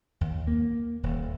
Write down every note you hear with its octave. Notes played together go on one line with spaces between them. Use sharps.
D#2
A#3
D#1